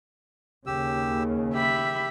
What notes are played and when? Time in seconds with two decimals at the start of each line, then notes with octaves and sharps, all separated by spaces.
0.66 D#2 C#3 G4 E6
1.54 G4 E5 B5